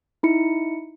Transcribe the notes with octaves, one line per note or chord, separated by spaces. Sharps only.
D#4 E4 C#7